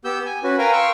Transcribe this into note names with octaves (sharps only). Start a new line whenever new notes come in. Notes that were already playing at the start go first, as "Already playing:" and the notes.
B3 G4 E6 G6
G#5
C#4 F#4 B4
A#4 B4 F5 G5 G#5 A#5
F5 G5 C6 C#6 E6